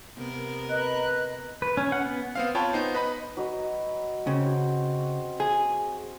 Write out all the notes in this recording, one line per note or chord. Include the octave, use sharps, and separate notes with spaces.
C3 B3 A#4
B4 D#5 A#5 F#6
B4
C#4
F#5
B3
B3 C4 F5
F4 C#5 G5 A5 B5
B3 D#4 C5
B4 D#5 B5
F#3 B4 D#5
C#3 C4
F#4
G#4